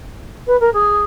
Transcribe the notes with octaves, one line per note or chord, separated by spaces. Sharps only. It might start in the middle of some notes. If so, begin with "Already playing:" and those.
B4
A#4
G#4